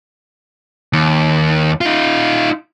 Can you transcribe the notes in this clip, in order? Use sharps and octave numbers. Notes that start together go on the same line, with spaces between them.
D#2
D#4 F4